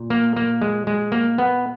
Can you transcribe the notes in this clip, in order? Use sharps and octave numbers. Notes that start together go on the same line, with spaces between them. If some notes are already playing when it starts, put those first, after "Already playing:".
Already playing: A#2
A#3
A#3
G#3
G#3
A#3
B3